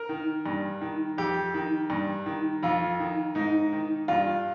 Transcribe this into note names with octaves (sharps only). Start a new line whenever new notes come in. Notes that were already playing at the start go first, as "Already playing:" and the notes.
Already playing: A#4
D#3
G2
D#3
F2 G4
D#3
G2
D#3
F2 F4
D#3
G#2 D#4
D#3
G2 F4